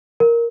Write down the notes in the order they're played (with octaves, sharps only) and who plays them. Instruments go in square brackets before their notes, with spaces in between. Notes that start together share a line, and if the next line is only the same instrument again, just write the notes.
[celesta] A#4